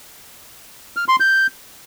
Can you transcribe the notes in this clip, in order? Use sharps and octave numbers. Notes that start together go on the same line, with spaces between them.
F6
C6
G6